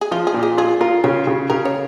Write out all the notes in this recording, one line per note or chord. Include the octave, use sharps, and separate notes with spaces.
G#4
F3 F4
G#4
A#2
G#4
F4 G#4
F4 A#4
C#3 C#5
C#3
C#3 A#4
C#5